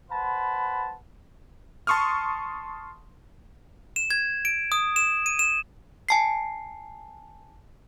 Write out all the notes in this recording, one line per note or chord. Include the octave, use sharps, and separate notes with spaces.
B4 C5 F#5 A5 B5
A5 C6 C#6 D#6 F6
E7
G#6
D7
D#6
E7
D#7
E7
G#5 A5 C7